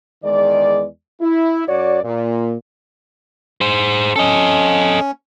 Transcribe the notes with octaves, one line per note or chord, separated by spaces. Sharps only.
E2 D#3 G#3 D5
E4
F#2 F#4 C#5 D5
A#2
G#4 C5
C#4 A4 D#5